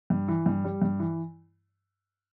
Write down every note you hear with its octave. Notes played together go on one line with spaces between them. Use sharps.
G2
E3
G2
G3
G2
E3